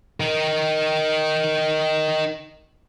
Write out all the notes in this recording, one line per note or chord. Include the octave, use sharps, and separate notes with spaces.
D#4 A#4